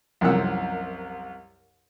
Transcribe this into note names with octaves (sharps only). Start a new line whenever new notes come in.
C2 F#2 F3 A#4 F#5 E6